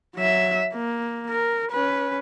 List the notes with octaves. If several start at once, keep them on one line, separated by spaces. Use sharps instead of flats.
F#3 E5
A#3
A#4
C#4 B4